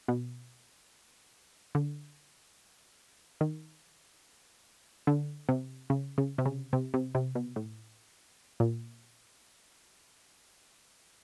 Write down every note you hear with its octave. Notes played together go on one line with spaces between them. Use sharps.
B2
D3
D#3
D3
C3
C#3
C#3
C3
C#3
C3
C3
C3
B2
A2
A#2